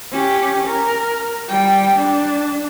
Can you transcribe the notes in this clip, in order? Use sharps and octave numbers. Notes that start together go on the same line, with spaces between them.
C#4 G4
A#4
G3 G5
D4